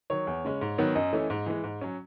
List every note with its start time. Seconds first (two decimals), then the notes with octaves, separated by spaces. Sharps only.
0.10 D#3 F#3 C#5
0.27 E2
0.44 C#3 G#3 C#4
0.61 G#2
0.78 D#3 F#3 B3
0.95 F#2 D#5
1.13 E3 A3 C#4
1.30 G#2
1.46 E3 G#3
1.64 G#2
1.81 F#3 C#4